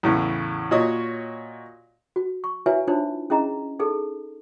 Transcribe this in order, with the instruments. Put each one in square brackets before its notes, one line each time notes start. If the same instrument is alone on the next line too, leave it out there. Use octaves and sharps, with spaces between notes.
[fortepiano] E2 A2 C#3
A#2 F#4 C#5 D#5 D#6
[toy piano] F#4
C#6
E4 F#4 B4 C#5 E5 G#5
D4 D#4 F4 C5 C#5
C#4 E4 G#4 D#5 A#5
D#4 G#4 A4